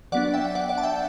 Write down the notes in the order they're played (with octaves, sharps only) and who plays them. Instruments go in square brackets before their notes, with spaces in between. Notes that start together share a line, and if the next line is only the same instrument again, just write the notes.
[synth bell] F#3 B3 D4 D5 F#5
E5 G5
D5 F#5
D5 F#5
A5
E5 G5